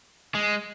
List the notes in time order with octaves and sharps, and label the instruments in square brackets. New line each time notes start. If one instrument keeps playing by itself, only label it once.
[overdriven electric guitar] G#3